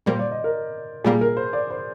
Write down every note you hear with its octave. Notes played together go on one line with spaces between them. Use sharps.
A#2 G3 A#3 C5
D5
D#5
A#4
A#2 G3 A#3 G#4
A#4
C5
D5
C5